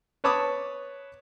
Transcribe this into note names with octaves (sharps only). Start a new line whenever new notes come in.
B4 C#5 A5 B5 D6 D#6